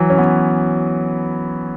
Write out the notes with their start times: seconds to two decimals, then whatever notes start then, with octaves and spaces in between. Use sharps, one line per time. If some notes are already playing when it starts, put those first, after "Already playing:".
Already playing: E3 F#3
0.10 C#4
0.18 B3